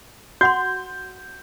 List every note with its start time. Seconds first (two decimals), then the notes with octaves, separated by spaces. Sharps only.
0.41 F#4 F#5 C6 G6